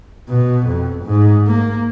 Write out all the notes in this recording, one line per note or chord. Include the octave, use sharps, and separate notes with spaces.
B2
F2
G#2
A#3